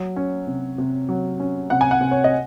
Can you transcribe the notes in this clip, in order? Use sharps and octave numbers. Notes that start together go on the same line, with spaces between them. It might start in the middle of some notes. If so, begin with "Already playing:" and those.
Already playing: F#3
C#4
C3
C3
F#3
C#4
C3 F#5
G#5
F#5
C3
C#5
D#5